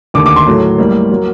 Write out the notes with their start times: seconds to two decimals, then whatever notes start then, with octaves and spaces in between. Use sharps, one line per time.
0.14 D#2 D3 A3 D6
0.26 D6
0.36 C6
0.47 A2 F#3 A3
0.78 A2 G3 A#3
1.11 F#3 A#3